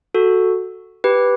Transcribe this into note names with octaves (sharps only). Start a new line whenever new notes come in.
F#4 A4
G4 B4